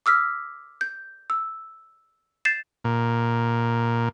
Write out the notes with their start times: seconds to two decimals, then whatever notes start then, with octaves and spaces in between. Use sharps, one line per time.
0.06 D6 E6 F6 B6
0.81 G6
1.30 E6
2.45 G6 A6 C7 E7
2.84 A#2